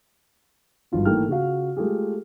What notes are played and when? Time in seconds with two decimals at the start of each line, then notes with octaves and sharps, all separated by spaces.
0.92 G#1 G2 F4 F#4
1.05 D#3 E3 A3 A#3 G5 F6
1.28 C#3 F4 F#4 F5
1.77 G#3 A3 F4 G4 G#4